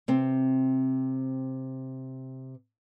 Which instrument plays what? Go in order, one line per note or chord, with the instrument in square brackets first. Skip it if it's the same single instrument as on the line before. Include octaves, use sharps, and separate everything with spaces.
[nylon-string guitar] C3 C4